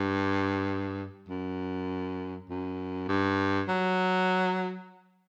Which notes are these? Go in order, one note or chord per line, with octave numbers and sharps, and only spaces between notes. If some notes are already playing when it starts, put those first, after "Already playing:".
Already playing: G2
F#2
F#2
G2
F#3